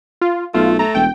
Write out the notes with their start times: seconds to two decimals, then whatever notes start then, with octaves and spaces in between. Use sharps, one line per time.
0.21 F4
0.54 B1 A3 F4
0.79 A3 A#5
0.95 E1 G5